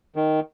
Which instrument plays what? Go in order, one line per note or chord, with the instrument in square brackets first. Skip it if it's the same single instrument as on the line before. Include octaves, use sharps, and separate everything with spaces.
[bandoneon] D#3